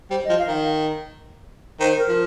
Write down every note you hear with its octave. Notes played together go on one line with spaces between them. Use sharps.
G3 C5
F3 D#5
F5
D#3
D#3 C5
A#4
F3